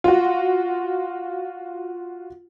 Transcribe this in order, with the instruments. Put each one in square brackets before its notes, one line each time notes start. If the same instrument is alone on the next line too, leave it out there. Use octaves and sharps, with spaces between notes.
[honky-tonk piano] F4 F#4